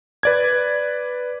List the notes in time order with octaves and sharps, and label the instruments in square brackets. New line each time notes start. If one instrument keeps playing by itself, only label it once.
[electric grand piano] B4 D5 G#6